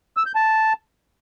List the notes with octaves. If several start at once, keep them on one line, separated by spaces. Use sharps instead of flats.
E6
G6
A5